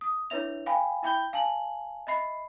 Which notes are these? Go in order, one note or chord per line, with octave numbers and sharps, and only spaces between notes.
D#6
D4 E4 B4 C#5 E5 F7
F5 G5 G#5 B5
E4 E5 G5 B5 G6 G7
F5 G#5 A5 F#7
D#5 E5 B5 C7